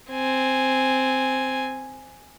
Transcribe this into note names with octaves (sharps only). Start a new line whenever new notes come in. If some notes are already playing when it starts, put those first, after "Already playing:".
C4 G#5